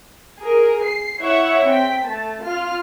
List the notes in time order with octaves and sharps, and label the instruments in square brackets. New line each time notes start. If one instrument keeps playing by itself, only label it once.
[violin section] G#4 A#4
C7
E4 C#5 E5 F#5 C#6
C4 G5 B6
A3 A5
F4 F6